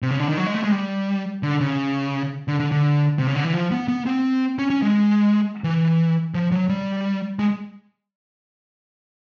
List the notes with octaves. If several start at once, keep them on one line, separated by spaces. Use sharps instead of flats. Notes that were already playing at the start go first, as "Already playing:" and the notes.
C3
C#3
D3
D#3
F#3
G#3
A3
G#3
G3
D3
C#3
D3
D3
D3
C3
C#3
D3
E3
F3
B3
B3
C4
C#4
C#4
G#3
E3
F3
F#3
G3
G#3